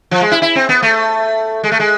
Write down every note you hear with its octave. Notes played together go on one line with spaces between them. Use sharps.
F3
G#3
E4
E4
C4
B3
A3
G#3
A3
G#3